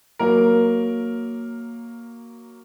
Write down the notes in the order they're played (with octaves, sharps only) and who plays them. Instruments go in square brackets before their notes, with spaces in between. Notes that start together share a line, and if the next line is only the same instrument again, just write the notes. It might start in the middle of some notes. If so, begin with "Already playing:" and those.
[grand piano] F#3 A#3 A#4